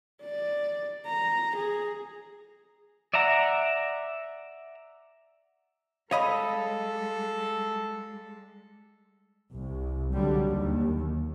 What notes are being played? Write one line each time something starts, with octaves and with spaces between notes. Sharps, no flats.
D5
A#5
G#4
D5 E5 F#5 A#5
G3 G#3 A4 C#5 D#5 F5 B5
C2
D3 F#3 G3
D#2